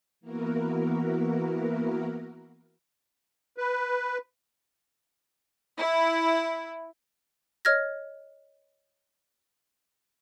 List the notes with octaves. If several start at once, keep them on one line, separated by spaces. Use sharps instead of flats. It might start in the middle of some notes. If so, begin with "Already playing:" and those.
E3 A#3 B3 E4 F#4 A#4
B4
E4
C#5 D#5 F6 G#6 A#6